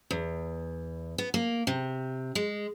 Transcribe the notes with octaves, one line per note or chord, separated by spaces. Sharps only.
E2
B3
A#3
C3
G#3